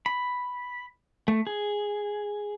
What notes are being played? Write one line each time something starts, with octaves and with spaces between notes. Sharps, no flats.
B5
A3
G#4